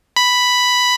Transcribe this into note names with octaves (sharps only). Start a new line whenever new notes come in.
B5